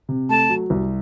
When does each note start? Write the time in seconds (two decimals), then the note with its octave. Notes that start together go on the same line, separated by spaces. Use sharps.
0.09 C3
0.29 A3 A5
0.50 F#3
0.70 C2